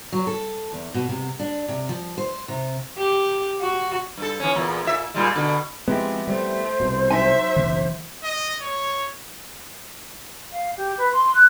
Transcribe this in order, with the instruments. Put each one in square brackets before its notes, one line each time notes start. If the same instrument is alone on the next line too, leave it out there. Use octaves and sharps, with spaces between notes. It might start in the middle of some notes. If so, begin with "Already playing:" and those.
[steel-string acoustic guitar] F#3
A4
E2
B2
C3
D4
C3
F3
C5
C3
[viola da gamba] G4
F#4
[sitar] G2 A4
E3 C#4
E2 A#2
A#2 E5
A#2 G3 G#3
B2 D3
[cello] F3 C4 [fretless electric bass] G#3 [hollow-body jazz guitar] B3 E4 G4
[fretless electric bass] G3 [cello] A3 [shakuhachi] C5
[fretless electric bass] C2 B2
[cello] F#3 E5 [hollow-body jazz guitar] D#4 G#5
[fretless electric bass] F#1 B1 [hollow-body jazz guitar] E3
[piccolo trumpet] D#5
C#5
[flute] F5
G4
B4
C6
F#6